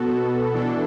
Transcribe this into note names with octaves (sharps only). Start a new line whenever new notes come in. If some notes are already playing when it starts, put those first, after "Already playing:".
Already playing: B2 B3 F#4 A4
E3 D4 A4